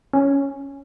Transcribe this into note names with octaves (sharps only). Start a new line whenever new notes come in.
C#4